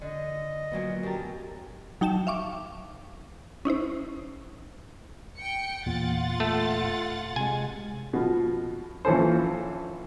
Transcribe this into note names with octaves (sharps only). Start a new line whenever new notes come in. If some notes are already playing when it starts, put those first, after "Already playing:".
D3 D#5
A#2 F#3 B3
F#2 G4 A#4 A5
F#3 D#4 G5 A5 E7
E5 F5 C#6 D6
C#4 D#4 E4 C5
G5 C#7
E2 A#2 F4 F#5 A6
A3
C3 G#3 G#5
B2 F3
A#1 E3 C#4 A4 C5